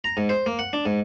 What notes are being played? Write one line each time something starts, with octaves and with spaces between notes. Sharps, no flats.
A#5
G#2
C5
A#3
F#5
D4
G#2